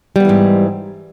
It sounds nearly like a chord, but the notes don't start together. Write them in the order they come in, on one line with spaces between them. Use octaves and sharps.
G3 B3 E3 G#2